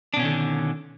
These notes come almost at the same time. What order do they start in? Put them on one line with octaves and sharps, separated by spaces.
D4 B2 C#4 D#3 D3